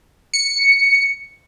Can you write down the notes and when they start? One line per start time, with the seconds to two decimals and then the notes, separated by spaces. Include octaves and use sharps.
0.34 C#7